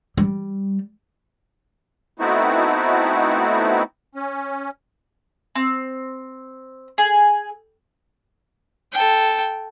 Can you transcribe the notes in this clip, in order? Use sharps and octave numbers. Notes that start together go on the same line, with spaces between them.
G3
A3 B3 C4 D#4 E4 F#4
C#4
C4
G#4
A4 G5